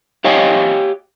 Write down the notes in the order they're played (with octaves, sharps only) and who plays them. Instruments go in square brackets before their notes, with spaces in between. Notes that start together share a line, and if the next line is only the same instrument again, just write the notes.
[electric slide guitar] G4 C#5 D#5 F5 G#5